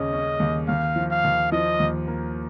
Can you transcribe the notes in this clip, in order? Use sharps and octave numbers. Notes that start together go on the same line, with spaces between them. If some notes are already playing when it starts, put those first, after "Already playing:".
Already playing: D#2 C#3 C#4 D#5
C#4
D#2
D#2 F5
F3
F5
D#2
F3 D#5
D#2
A#3